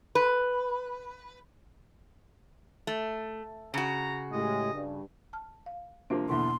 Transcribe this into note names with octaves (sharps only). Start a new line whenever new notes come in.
B4
A3
C#3 F#4 A#5
A2 G#3 G4 D#5
G2
A5 F6
F5
C3 F3 A#3 D4
E2 B2 D3 E3 A#3 C6